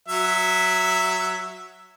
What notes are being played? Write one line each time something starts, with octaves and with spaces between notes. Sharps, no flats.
F#3 E5